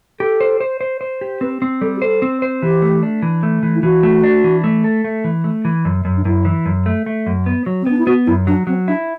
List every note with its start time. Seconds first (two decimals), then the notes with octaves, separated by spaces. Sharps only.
0.20 G4 A4
0.41 C5
0.61 C5
0.81 C5
1.01 C5
1.21 G4
1.41 C4 B4
1.62 C4
1.81 G3 A4
1.97 G4
2.02 A4 C5
2.22 C4
2.42 C5
2.62 E3 G4
2.82 A3
3.03 D4
3.22 E3
3.43 A3
3.63 E3
3.75 E4
3.83 E3 F#4
4.03 A3
4.24 D4
4.44 E3
4.64 A3
4.84 A4
5.04 A3
5.24 E3
5.44 A3
5.65 E3
5.85 F#2
6.05 F#2
6.17 D4
6.25 F#2 E4
6.45 E3
6.66 F#2
6.86 A3
7.06 A3
7.27 F#2
7.46 B3
7.66 F#3
7.82 C4
7.86 B3 D4
7.99 E4
8.07 B3 F#4
8.27 F#2 E4
8.47 F#3 D4
8.67 F#3 C4
8.88 D4 E4